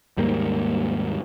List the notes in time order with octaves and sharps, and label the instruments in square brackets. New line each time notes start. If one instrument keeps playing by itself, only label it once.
[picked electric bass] D#2 G#2 G3 A#3